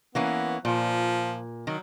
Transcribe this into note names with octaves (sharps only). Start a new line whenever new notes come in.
E3 A#3 B3 C#4
A#2 F3
D#3 F#3